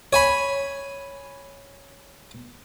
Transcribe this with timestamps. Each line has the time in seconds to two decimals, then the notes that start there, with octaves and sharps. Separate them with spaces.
0.13 C#5 G#5 B5